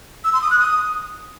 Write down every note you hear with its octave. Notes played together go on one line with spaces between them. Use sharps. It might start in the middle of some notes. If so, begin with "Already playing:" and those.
E6
C6
D#6
F#6
D#6